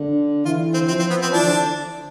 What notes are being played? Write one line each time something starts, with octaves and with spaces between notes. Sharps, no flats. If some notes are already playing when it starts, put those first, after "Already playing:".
Already playing: D3
E3 F4
C4
F3 C4
C4
B3
C4
E3 D4
D3